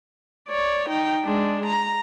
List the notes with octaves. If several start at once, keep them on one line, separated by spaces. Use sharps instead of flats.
C#5 D5
D#4 G5
G#3 D4
A#5